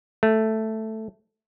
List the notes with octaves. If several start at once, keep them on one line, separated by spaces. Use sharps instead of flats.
A3